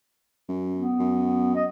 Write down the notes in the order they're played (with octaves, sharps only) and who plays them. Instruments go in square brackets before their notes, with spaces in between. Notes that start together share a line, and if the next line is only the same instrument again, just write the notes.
[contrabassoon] F#2
[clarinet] B3
[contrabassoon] F#2
[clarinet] D#5